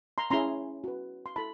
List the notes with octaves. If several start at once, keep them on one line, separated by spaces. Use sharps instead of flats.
A#5 C6
C#4 E4 G#4 A#5 C6
F#4 B4
C6
E4 A4 A5 B5